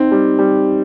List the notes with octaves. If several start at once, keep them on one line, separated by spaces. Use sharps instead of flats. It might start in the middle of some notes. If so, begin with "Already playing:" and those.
Already playing: C4 D#4
G3
G3